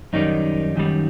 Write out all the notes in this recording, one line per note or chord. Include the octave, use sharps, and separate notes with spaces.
F#2 D#3 G3 D#4
F#2 D#3 G3